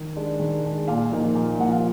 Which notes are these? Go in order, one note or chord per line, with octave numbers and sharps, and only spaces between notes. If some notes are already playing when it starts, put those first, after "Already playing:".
Already playing: D#3
G#3 D4
D#3
G#3 D4
A#2 F5
F3 A#3 D#4
A#2
F3 A#3 D#4 F#5
F5